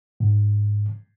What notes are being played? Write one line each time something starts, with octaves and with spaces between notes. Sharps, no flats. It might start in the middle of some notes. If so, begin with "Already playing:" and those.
G#2